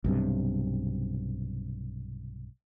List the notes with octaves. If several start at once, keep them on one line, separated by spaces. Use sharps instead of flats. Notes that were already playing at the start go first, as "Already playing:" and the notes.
B1 G2 C3